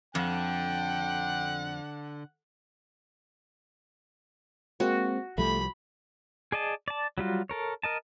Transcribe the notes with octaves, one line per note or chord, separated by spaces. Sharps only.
F2 D3 F#5 G5
G#3 A#3 C4 F#4
C2 F3 G3 A3 B5
G#4 D5 D#5 A5
D5 A5
F#3 G3 F4 F#4
A4 A#4 C#5
A#4 D#5 A5